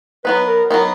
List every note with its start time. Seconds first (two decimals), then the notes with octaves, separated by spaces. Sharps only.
0.25 F#3 B3 D#4 B4
0.48 A#4
0.70 F#3 B3 D#4 A#4